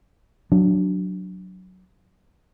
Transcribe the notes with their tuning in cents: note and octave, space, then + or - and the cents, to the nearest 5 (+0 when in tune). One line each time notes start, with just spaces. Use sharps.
F#3 +0 D4 -5